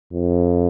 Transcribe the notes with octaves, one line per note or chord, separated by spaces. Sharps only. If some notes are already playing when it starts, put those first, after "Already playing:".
F2